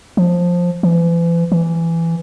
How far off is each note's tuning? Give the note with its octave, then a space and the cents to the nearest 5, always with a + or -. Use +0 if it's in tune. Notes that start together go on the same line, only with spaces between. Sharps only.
F3 +10
E3 +40
E3 +15